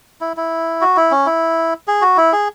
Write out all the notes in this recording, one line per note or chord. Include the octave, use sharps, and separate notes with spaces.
E4
E4
F#4
E4
C#4
E4
G#4
F#4
E4
G#4